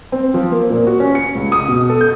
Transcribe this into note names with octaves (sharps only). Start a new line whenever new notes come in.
C4
F3
A#3
A#2
F#4
C#4
C#7
C#2
D#6
B2
A4
G6